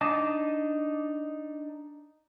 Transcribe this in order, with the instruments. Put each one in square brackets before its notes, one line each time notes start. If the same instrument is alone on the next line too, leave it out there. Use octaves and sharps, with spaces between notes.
[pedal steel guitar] D4 D#4 D#5 A5 D6